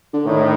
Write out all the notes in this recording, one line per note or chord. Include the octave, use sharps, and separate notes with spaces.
D3
A2 D#3